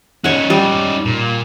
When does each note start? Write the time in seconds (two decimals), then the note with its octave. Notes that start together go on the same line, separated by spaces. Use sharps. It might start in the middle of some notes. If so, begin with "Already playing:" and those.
0.24 C#4 D#4 C#5 F#5
0.50 G3
1.05 A#2